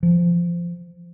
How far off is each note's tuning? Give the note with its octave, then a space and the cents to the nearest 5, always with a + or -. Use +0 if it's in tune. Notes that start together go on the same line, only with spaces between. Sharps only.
F3 -15